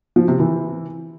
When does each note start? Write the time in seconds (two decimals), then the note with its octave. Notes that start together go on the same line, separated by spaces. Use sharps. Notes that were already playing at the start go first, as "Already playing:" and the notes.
0.16 F3
0.28 C3
0.40 E3